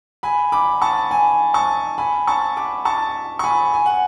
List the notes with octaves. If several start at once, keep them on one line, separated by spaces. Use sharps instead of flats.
G#5 B5
B5 D6
A5 C#6
G#5 B5
A5 C#6
G#5 B5
A5 C#6
B5 D6
A5 C#6
C#6
G#5 B5
G#5
F#5